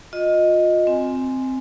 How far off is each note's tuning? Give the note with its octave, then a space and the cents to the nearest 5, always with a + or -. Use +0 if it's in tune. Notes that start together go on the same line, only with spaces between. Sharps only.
F4 +30 D#5 +0
C4 -5 G#5 +0